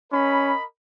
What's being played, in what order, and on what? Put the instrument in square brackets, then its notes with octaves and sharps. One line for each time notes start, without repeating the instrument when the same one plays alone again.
[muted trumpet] C#4 [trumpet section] A#4 D#5 B5